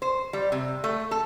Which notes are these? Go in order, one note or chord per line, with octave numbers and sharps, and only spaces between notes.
C5
G3
C3
A3
A4